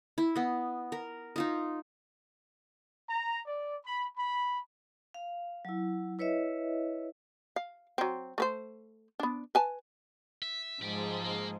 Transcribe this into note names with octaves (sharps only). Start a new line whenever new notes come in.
E4
B3 D#5
A#4
D#4 F4 D#5
A#5
D5
B5
B5
F5
F#3 E4
E4 B4 C#5 D#5 E5
F5
F#3 C4
A3 B4 C5
B3 D4
B4 G#5 A5
E5
G#2 F3 G#3 G4 D5
A#3